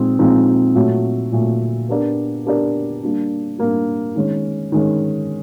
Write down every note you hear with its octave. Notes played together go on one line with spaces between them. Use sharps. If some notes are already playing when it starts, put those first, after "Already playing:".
Already playing: A#2 F3 G#3 C4 D#4
A#2 F3 G#3 C4 D#4
A#2 F#3 A3
A#2 F#3 A3
B3 D4 G4 A#4 D5
B3 D4 G4 A#4 D5
G3 A#3 D4
G3 A#3 D4
D#3 G#3 C#4
D#3 G#3 C#4